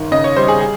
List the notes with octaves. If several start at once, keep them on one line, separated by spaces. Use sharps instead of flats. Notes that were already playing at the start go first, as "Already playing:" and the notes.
Already playing: G1 D#3
C#3 D#5
C#5
G3 C5
G#4
G#4